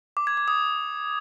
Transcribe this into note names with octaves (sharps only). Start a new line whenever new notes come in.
D6
G#6
D6
D#6